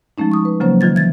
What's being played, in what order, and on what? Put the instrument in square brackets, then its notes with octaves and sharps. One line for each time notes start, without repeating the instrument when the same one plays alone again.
[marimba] F3 G#3 A3 C#4 D#4
C#6 D#6
B4
C#3 F3 F#3 A#3 C#4 C5
D#3 F4 G#6 A6
E3 G#6 A6